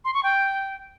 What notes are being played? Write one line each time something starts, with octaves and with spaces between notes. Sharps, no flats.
C6
C#6
G5